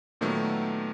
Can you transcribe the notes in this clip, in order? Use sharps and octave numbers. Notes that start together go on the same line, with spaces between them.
A#2 D#3 F#3 A3 B3